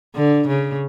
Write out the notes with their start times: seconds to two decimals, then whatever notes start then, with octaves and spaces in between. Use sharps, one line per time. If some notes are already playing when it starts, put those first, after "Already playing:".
0.16 D3
0.48 C#3